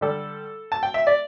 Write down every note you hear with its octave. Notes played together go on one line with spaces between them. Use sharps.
D3 G3 A4
A5
G5
E5
D5